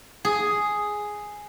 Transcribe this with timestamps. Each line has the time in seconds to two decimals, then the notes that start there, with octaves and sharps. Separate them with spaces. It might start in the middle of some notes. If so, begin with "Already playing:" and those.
0.25 G#4